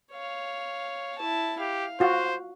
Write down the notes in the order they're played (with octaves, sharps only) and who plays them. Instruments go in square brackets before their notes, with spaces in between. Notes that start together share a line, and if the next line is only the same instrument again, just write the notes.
[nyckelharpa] C#5 F5
E4 A5
[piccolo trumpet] G4 [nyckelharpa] F5
[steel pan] F4 F#4 [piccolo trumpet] C5